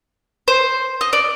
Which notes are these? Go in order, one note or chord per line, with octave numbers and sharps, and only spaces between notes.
C5
D#5
D5